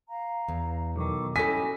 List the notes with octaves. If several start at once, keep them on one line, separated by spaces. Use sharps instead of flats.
F5 A#5
E2
B1 D#3 A4 C#6 D6
G3 C#4 E4 F#4 A4 D#5 G#5 B6